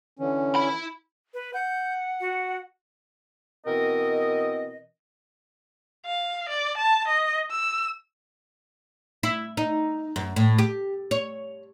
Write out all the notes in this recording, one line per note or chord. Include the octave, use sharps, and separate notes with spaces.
D3 E3 C#4
E4 B5
B4
F#5 G6
F#4
B2 E3 C4 A#4 D#5
F5
D5
A5
D#5
E6
E4
D#4
F#2
A2
G4
C#5